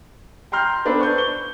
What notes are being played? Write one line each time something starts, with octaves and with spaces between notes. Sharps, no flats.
G5 A#5 C6 F6 G6
B3 D4 A4 B4 C5
C#6 G6
G7